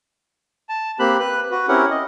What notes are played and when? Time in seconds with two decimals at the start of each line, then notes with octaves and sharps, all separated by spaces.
0.69 A5
0.99 A#3 C4 G4 B5 F#6
1.19 B4 F#6
1.51 F#4 B4
1.68 C4 C#4 E4 G4 A#4 F#5
1.91 D#5